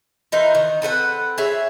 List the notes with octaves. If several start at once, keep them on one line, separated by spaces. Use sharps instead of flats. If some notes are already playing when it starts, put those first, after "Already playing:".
E3 D#4 A#4 C5
D#3
C4 A4 B4 F#5
G#4 C#5 E5